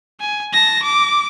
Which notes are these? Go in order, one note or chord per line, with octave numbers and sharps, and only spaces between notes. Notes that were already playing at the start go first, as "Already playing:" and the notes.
G#5
A5 A#6
D6